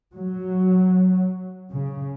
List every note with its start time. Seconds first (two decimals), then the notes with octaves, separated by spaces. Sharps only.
0.14 F#3
1.70 C#3